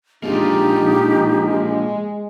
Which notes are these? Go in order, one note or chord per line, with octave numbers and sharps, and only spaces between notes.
G#3 A#3 D4 D#4 F4 G4